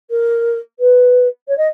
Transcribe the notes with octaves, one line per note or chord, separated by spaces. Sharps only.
A#4
B4
C#5
D#5